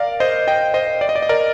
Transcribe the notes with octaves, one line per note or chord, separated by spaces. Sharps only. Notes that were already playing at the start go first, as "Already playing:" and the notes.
Already playing: A#4 D5 F5
C5 D#5
D#5 G5
C5 D#5
D5
D#5
D5
D#5
A#4 D5